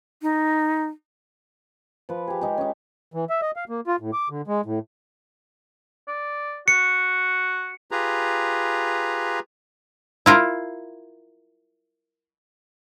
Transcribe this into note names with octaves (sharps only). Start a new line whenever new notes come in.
D#4
F3 B4
G4 G#4
G#3 D#4 G4
C#4 D#4
E3
E5
D#5
F5
A#3
F4
A2
D6
D3
G#3
A2
D5
F#4 C#7
F4 G4 G#4 B4 A#5
E4 F4 A#4